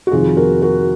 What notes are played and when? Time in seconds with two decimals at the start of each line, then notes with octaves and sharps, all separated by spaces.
0.07 F#4
0.12 F2 C3 D#3 F4 G#4
0.37 F#4 A#4
0.62 F#4 A#4